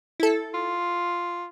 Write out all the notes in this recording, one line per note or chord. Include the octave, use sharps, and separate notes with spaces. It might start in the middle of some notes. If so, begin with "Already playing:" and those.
E4 A4
F4